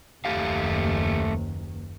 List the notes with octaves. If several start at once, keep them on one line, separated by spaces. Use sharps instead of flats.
F#1 D#2 A3 G4 F5